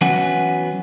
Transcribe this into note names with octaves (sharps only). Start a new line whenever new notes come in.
E3 F#3 B3 C#4 F#5 G#5